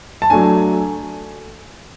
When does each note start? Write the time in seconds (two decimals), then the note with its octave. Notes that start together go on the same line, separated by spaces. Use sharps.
0.22 A5
0.30 F#3 A3 D4 G#5